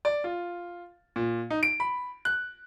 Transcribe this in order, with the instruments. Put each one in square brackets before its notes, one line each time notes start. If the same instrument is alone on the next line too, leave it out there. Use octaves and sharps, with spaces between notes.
[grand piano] D5
F4
A#2
D#4
D7
B5
F#6